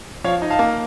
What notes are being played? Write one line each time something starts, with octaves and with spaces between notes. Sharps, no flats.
F3 C#5 F5
D#4
F5 A5
A#3